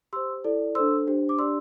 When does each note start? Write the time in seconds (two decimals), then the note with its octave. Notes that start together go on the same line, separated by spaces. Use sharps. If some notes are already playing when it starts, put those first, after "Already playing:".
0.13 G4 C5 C6 E6
0.44 E4 A4 D5
0.75 D4 A4 C5 C6 E6
1.07 D4 G4 C5
1.29 D6
1.38 D4 G4 D5 C6 E6